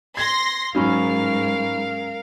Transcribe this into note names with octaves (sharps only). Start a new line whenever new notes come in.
C6 G#6 A#6
G#2 F#3 C#4 D#4 A#4 F5 B5 C#6